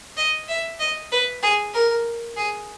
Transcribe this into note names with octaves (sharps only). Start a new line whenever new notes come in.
D#5
E5
D#5
B4
G#4
A#4
G#4